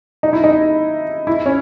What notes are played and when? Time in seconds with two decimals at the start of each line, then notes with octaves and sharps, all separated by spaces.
0.23 D#4
0.33 E4
0.44 D#4
1.27 E4
1.46 C#4